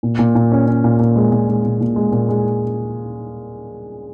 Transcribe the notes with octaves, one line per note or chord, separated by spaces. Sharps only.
A#2
A#2
A#2
C#4
C#4
A#2
A#2
G#3
A#2
G#3
A#2
A#2
G#3
A#2
G#3